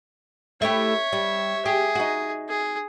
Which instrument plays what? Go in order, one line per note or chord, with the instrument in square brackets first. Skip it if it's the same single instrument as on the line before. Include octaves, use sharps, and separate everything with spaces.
[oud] A3 E4 G4 [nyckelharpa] C#5 [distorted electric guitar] E5
[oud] G3
[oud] G4 [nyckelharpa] G#4
[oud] D#4 F#4
[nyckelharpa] G#4